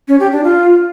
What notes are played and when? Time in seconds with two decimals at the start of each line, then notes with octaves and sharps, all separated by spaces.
0.08 C#4
0.20 G4
0.32 D4
0.44 F4